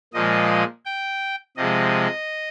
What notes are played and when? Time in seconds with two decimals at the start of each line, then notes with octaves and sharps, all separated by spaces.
0.13 A#2 F3 G#3 D#5
0.85 G5
1.57 C3 F3 G#3 D#5